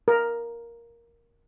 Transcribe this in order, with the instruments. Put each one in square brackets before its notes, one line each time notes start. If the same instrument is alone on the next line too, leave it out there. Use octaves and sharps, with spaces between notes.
[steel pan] A#4